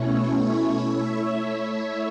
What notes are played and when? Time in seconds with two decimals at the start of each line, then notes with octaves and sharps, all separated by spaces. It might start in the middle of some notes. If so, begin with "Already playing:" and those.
Already playing: B2 A3 C#4 E4 C#5
0.77 A3 E4 C#5 E5